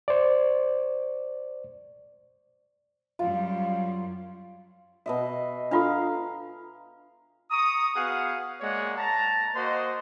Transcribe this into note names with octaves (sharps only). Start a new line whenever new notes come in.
C5 D5
F#2 F#3 G3 F4
B2 D#5 E5
D4 F4 A4 F5 A#5 C6
A#5 C#6 D#6
B3 F#4 G#4 F5 F#5
G#3 A#3 C#5 D5 F#5
A5 A#5
A#3 F#4 C5 D#5 C6